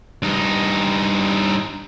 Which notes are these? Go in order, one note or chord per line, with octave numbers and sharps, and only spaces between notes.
G2 D#4